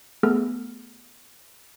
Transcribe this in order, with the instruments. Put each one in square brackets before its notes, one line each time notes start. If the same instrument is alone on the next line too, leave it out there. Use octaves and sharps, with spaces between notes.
[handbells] A3 B3 G#4 A4 F6